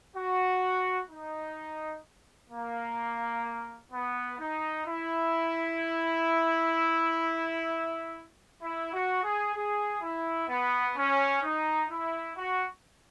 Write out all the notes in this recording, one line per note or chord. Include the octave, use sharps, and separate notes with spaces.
F#4
D#4
A#3
B3
D#4
E4
E4
F#4
G#4
G#4
E4
B3
C#4
D#4
E4
F#4